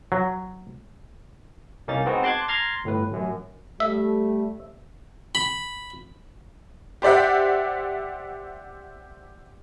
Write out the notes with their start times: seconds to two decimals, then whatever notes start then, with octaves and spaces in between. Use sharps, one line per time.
0.12 F#3
1.88 C2 A#3 C#4 D#4 A6
2.05 G#3 B3 C4 D#4 F#4
2.23 A5 C6 D6 F#6 G#6
2.48 A#5 C6 F6 G#6 A6
2.84 G1 A2 B4
3.11 A1 F#2
3.80 G3 A3 E5
5.35 B5
7.02 G4 C5 D5 E5 F#5